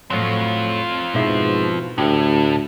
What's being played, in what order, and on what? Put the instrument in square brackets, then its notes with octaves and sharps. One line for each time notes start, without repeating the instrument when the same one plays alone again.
[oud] A2 F#3 [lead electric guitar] C4 F4
[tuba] G#2 [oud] B2 F3 E4
[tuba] D2 [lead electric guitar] A2 [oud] G4